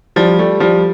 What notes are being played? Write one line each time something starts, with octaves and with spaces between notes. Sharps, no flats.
F3 G3
G3 A3
F3 G3